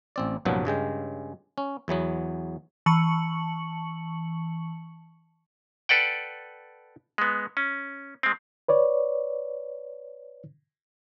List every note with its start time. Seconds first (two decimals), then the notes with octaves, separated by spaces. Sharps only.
0.16 A1 C4 D5
0.45 C2 G2 A#2 F3 F#3 B3
0.65 G2 C#3 G#3 G5
1.58 C#4
1.88 E2 E3 F#3 B3
2.86 E3 A5 C#6 C#7 F#7
5.89 A4 B4 D5 F#5 G5
7.18 G#3 B3
7.57 C#4
8.23 G#3 C4
8.68 B4 C#5 D5